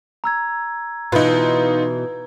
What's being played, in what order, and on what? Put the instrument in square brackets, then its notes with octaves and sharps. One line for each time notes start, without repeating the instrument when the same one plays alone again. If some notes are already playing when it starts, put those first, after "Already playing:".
[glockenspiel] A#5 E6 G#6
[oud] B2 E3 [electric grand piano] D#4 F4 [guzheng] B4